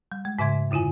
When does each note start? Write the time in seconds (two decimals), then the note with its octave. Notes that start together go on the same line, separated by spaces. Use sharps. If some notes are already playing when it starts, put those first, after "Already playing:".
0.12 G3
0.25 G#3
0.39 G#2 C#3 E5 C6 G#6
0.71 F#2 D3 E4 F4 G#5